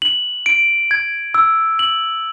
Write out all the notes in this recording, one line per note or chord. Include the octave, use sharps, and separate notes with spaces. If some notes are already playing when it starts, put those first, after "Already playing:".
F#7
D7
G#6
E6
F#7